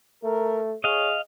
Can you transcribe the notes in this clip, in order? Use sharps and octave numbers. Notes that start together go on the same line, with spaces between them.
A3 A#4
G#4 C#5 D#5 F5